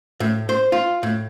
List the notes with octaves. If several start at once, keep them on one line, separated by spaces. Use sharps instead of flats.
A2
C5
F4
A2